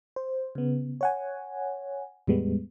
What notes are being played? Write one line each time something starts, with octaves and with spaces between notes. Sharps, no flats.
C5
C#3 B3
C#5 F#5 G#5
E2 A2 G3 G#3 B3